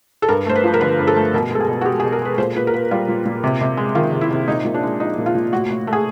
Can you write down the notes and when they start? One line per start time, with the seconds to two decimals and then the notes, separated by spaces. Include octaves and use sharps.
0.22 A4
0.29 G2 A#4
0.46 A3 C5
0.56 B4
0.64 F3
0.74 A#4
0.81 D3 B4
0.99 G2
1.07 A4
1.16 A3
1.34 B2 A#4
1.51 G#3 A4
1.60 G#4
1.68 B2
1.81 F#4
1.85 G#3 G4
2.00 G#4
2.04 B2
2.12 A#4
2.22 G#3 B4
2.38 A#2 C5
2.56 A#2 B4
2.67 A#4
2.74 A#3 B4
2.91 G3 F4
3.08 A#2
3.26 A#2
3.44 C3
3.61 C3
3.77 G#3
3.95 D#3 F4
4.12 C3
4.21 E4
4.31 C3
4.48 A#2 D#4
4.65 A#2
4.74 D4
4.83 G#3
5.00 F3 D#4
5.18 A#2
5.26 F4
5.35 A#2
5.53 A2 F#4
5.70 A2
5.87 A3
5.93 G#4